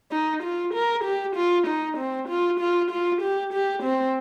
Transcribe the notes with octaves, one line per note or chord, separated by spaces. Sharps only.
D#4
F4
A#4
G4
F4
D#4
C4
F4
F4
F4
G4
G4
C4